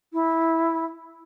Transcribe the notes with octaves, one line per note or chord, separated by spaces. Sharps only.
E4